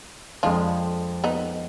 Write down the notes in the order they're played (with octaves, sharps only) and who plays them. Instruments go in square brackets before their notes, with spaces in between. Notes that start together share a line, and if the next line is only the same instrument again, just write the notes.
[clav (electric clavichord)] F2 F3 G#3 [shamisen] D4 F4
[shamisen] B3 D#4